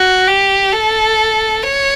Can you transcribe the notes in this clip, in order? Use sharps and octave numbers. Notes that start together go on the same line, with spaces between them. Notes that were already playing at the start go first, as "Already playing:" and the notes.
Already playing: F#4
G4
A4
C#5